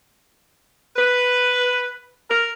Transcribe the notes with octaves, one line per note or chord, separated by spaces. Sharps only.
B4
A#4